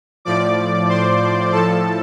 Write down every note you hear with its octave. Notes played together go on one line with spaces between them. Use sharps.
A2 F3 D5 D6
C5 C6
A2 F3 A4 A5